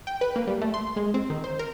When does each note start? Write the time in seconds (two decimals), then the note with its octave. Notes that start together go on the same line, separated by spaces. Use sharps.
0.07 G5
0.21 B4
0.36 A#3
0.47 G3
0.61 A3
0.74 C6
0.96 G#3
1.14 C4
1.30 D#3
1.44 C5
1.59 A#4